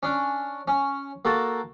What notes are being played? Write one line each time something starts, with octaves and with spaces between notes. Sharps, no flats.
C#4 D4
C#4
A#3 F#4 A4 A5